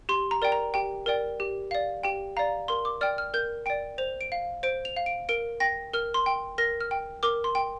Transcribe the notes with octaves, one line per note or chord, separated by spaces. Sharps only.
G4 C6
A#5
A#4 D5 G5
A#5
G4 G5
A#4 D5 G5
G4
D5 F5
G4 G5
D5 F5 A#5
A#4 C6
D6
D5 G5 F6
F6
A#4 G6
D5 G5 D7
C5 F7
D7
F5
C5 D7
F7
F5
D7
A#4 D7
G5 A#6
A#4 F6
C6
G5
A#4 A#6
F6
G5
A#4 D6
C6
G5